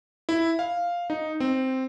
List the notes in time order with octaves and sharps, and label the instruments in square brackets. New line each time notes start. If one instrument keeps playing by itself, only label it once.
[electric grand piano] E4
F5
D#4
C4